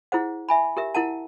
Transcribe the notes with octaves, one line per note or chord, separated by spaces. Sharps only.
E4 G#4 C5 F#5
E5 G#5 B5
G4 A#4 E5
E4 A#4 F#5 A5